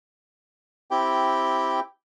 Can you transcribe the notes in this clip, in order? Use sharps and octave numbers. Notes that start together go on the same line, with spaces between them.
C4 E4 G4 G5